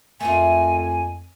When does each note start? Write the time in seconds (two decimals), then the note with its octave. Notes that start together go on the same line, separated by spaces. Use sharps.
0.20 F2 A3 A#3 F4 G#5